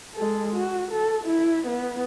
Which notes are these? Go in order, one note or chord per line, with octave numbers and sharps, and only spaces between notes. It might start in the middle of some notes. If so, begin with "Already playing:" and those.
G#3 A4
F#4
A4
E4
B3